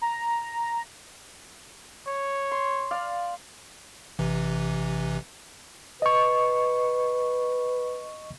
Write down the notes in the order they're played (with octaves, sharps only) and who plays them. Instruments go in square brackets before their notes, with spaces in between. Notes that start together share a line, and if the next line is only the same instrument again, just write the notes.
[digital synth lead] A#5
[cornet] C#5
[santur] C6
D5 F5
[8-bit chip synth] A1 C3 E3
[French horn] B4 [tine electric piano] D#5 C#6